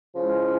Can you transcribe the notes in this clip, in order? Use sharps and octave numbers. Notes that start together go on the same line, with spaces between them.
C#3 F3 G#3 C#4 E4